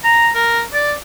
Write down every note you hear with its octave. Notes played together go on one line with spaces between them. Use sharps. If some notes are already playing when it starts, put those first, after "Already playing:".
A#5
A#4
D5